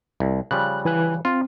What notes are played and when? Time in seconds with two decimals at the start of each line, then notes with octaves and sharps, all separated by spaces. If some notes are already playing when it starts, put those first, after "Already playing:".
0.20 C2
0.51 C#3 F3 G3 F#6
0.85 E3 G#5 F#6
1.25 C4 F4